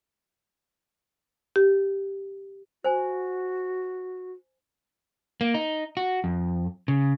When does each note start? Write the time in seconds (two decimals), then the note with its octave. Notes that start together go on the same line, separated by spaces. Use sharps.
1.56 G4
2.84 F#4 C5 G#5
5.41 A#3
5.54 D#4
5.97 F#4
6.24 F2
6.88 C#3